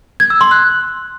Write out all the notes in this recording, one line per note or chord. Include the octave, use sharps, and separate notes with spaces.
G#6
E6
C6
F#6